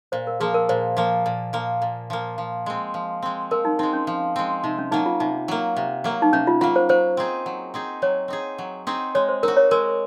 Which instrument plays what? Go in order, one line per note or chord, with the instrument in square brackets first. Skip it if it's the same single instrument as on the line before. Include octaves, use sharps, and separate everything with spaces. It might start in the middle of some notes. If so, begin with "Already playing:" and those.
[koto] A#2 [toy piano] C5
[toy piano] A#4
[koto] F3 A#3 [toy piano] G#4
[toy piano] A#4
[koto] A#2 [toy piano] C5
[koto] F3 A#3
A#2
F3 A#3
A#2
F3 A#3
F3
G#3 C4
F3
G#3 C4
[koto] F3 [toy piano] A#4
[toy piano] D#4
[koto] G#3 C4 [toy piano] D#4
[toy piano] C#4
[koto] F3
G#3 C4
[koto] C3 [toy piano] D#4
[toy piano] C#4
[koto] F#3 A#3 [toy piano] D#4
[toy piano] F4
[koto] C3 [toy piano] D#4
[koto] F#3 A#3
C3
F#3 A#3
[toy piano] D#4
[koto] C3 [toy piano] C#4
[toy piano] F4
[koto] F#3 A#3 [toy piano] F4
[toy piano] C5
[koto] F#3 [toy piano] C5
[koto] C4 D#4 G#4
F#3
C4 D#4 G#4
[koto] F#3 [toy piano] C#5
[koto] C4 D#4 G#4
F#3
C4 D#4 G#4
[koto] G#3 [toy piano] C#5
[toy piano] C5
[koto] D#4 F#4 [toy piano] A#4
[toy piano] C#5
[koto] G#3 [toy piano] A#4